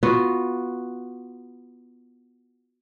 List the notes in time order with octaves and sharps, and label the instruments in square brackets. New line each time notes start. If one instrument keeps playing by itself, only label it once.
[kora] B3 F4 F#4